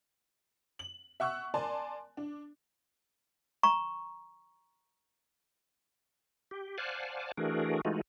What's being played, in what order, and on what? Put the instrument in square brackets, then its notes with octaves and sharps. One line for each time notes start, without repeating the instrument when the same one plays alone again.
[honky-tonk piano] F#7
E5 F#5 C#6 E6 F#6
A#4 D5 G#5 A5 C6
D4
[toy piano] A#5 C#6
[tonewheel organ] G4
C5 D5 F5 F#5 G#5 A5
E3 A3 D4 F#4 G#4 A#4
E3 G#3 A3 D#4 F4 F#4